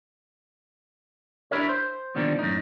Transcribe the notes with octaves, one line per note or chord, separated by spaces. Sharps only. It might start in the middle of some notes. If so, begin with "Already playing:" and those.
D4 E4 G4 A#4 C#5
C5
B2 D3 D#3 F3 G3 A#3
F#2 A2 D#4